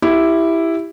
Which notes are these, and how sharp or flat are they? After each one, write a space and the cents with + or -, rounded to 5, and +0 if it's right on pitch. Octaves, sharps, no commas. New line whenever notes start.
E4 +0 G4 +0